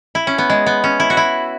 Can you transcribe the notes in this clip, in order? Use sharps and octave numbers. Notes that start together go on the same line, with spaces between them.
E4
C#4
B3
G#3
B3
C#4
E4
F#4
E4